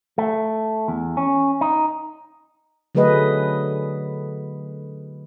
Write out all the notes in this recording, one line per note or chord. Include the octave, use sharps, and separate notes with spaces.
A3
E2
C#4
D#4
D3 F#3 A3 G#4 B4 D#5